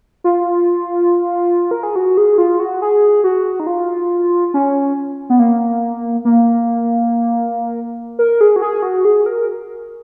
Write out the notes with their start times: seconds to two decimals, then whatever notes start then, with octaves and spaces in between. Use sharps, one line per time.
0.24 F4
1.71 A#4
1.83 G#4
1.96 F#4
2.17 G#4
2.38 F4
2.59 F#4
2.82 G#4
3.24 F#4
3.60 D#4
3.67 F4
4.54 C#4
5.30 B3
5.39 A#3
6.25 A#3
8.19 A#4
8.41 G#4
8.56 F#4
8.62 G#4
8.83 F#4
9.05 G#4
9.26 A#4